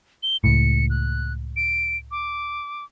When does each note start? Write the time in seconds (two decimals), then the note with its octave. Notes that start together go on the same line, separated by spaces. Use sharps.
0.23 G7
0.44 C#2 A2 C#7
0.90 F#6
1.56 D7
2.11 D6